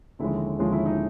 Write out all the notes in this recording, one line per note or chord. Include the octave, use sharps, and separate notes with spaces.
D#2 D3 F3 G#3 C#4 E4
D#2 D3 F3 G#3 C#4 F4
E4
D#4